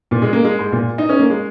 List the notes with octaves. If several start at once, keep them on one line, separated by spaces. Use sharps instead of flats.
A#2
G#3
A#3
G#3
G#2
A#2
D#4
C#4
A#3
G#3